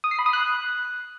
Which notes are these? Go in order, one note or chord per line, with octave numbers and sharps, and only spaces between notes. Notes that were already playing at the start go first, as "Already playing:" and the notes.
D#6
C7
B5
D#6
F#6